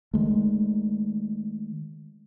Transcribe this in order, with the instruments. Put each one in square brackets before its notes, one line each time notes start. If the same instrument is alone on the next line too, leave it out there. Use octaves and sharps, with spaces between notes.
[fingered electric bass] D#3 G#3 A3